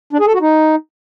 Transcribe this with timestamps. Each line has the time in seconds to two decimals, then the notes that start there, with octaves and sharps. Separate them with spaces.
0.13 D4
0.20 G#4
0.27 A4
0.34 F#4
0.41 D#4